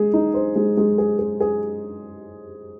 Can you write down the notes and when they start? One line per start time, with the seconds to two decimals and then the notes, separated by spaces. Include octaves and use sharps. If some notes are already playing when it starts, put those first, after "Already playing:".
Already playing: G#3 G#4
0.14 D#4
0.34 C5
0.56 G#3
0.77 G#3
0.98 G#4
1.19 G#4
1.40 G#4